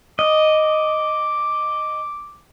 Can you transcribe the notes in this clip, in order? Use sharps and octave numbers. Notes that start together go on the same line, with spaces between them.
D#5 D6